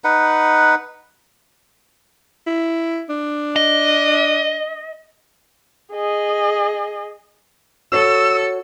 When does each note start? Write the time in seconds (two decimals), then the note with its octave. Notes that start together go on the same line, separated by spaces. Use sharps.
0.04 D#4 B4 F#5
2.47 E4
3.09 D4
3.56 D#5
5.93 G#4 D#5
7.92 F#4 A4 C#5 E6